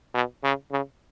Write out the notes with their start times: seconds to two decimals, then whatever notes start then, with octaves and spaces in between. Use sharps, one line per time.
0.14 B2
0.44 C#3
0.71 C#3